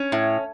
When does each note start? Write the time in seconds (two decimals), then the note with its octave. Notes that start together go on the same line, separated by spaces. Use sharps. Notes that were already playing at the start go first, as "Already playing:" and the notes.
Already playing: C#4
0.12 A2